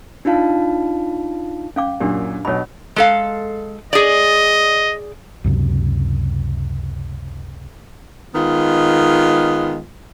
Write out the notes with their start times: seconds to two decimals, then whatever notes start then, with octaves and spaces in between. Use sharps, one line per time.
0.25 D4 D#4 F4 F5 A5
1.76 C#4 F5 G5 D6
2.00 F#2 A#2 D4 G4
2.45 B1 B2 C#5 B5
2.96 G#3 A4 F5
3.93 G#4 D5 D#5
5.44 C#2 F#2 C3
8.35 D#3 G#3 B3 F4